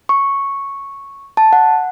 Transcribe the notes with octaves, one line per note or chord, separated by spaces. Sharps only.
C#6
A5
F#5